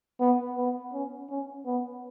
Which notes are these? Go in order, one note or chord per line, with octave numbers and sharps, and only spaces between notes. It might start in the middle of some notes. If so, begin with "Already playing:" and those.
B3
B3
C#4
C#4
B3